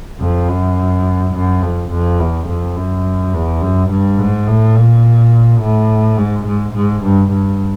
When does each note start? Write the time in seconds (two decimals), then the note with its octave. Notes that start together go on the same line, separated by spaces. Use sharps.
0.20 F2
0.49 F#2
1.34 F#2
1.62 F2
1.91 F2
2.19 E2
2.48 F2
2.76 F#2
3.33 E2
3.62 F#2
3.90 G2
4.18 G#2
4.47 A2
4.76 A#2
5.61 A2
6.17 G#2
6.46 G#2
6.75 G#2
7.03 G2
7.31 G2